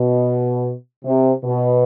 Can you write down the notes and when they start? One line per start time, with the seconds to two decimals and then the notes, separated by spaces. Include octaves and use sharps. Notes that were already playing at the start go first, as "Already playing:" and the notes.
Already playing: B2
1.05 C3
1.44 B2